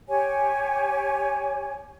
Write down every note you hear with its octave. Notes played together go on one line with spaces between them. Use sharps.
G4 C#5 G#5